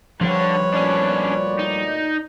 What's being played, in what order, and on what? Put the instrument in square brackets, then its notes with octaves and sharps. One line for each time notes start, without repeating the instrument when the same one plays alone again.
[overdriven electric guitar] D3 D4 [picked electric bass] F3 G3 [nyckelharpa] B4 C#5
[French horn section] D2 A#2 D5 [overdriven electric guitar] C#4 D4
[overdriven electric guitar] D#4